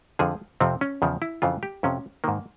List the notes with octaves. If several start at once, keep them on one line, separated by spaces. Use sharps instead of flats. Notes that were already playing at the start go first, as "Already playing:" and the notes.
F2 D3 F3 G#4
F2 C3 F3 C4
C#4
E2 C#3 F3
E4
F2 C#3 E3 F4
G4
F2 C3 F3 C#4
G#2 D#3 A#3